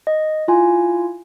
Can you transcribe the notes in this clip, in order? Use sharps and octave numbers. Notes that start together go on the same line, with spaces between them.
D#5
E4 F4 G#5